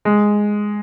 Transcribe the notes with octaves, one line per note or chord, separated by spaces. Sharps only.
G#3